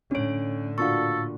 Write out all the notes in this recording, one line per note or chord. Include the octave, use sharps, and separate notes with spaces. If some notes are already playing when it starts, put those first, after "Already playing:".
A2 D3 C#4 D4 C#5 D7
A#2 D4 F#4 A4 F5 C#6